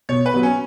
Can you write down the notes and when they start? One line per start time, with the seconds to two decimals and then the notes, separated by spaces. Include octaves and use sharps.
0.09 B2 C#5
0.26 B4
0.34 F#3 B3
0.43 C#4